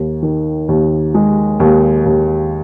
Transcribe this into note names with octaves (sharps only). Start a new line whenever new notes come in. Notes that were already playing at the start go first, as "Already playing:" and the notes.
Already playing: D#2
D#3
D#2
G#3
D#2
D#2